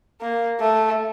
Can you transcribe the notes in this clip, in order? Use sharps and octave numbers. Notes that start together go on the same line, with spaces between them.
A#3
A3